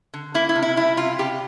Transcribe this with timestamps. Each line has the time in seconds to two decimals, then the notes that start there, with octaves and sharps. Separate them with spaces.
0.14 D3
0.34 A#3 E4
0.49 E4
0.56 C3
0.62 E4
0.76 G3 E4
0.97 C3 F4
1.19 C3 G4